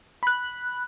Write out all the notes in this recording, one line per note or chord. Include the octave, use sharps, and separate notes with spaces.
B5 F#6